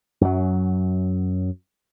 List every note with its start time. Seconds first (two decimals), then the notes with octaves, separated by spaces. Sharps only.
0.21 F#2 F#3